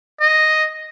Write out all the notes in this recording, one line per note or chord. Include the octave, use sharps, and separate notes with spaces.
D#5